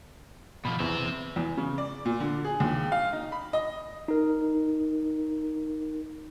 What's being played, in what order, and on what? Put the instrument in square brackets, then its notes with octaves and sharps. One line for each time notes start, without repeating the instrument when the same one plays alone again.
[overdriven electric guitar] B2 F3 [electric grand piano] B5
[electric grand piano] E2 [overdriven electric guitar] C4 E5
[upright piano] E2
C#3
D5
A#2
D3
G#4
D#2
F5
D#4
B5
D#5
[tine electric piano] D#4 A#4